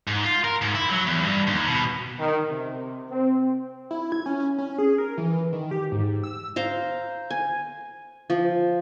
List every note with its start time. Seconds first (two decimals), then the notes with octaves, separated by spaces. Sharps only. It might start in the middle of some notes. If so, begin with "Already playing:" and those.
0.07 G#2
0.24 F4
0.44 A#4
0.62 G#2
0.75 E4
0.90 F#3
1.06 E2
1.23 G2
1.47 D#2
1.67 B2
2.19 D#3
2.51 C3
3.10 C4
3.91 E4
4.12 G#6
4.26 C#4
4.58 C#4
4.78 G#4
4.98 A#4
5.18 E3
5.53 D#3
5.71 G4
5.92 G#2
6.23 E6
6.56 C5 F5 A#5
7.30 G#5
8.30 F3